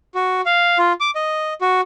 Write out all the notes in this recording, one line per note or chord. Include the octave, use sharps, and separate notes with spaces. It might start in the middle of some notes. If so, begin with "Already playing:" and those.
F#4
F5
F4
D6
D#5
F#4